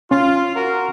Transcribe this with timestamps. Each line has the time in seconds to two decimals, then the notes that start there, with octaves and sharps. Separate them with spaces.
0.11 C#4 F4
0.56 F#4 A#4